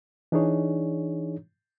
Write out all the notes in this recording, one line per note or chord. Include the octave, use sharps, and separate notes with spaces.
E3 D4 D#4 G#4 C#5